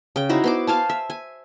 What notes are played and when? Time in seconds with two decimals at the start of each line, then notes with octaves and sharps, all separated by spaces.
0.16 C#3 G5
0.29 D#4 E4 F#4 C5
0.44 B3 C5 D6
0.67 C5 F5 G#5 A5
0.89 E5
1.10 G#5